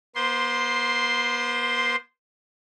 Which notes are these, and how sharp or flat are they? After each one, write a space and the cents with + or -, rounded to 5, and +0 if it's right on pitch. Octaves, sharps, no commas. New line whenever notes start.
B3 -45 C5 -10 C6 +0